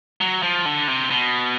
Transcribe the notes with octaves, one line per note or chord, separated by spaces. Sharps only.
F#3
F3
D3
C3
B2